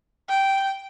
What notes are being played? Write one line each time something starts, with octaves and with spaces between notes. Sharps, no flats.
G5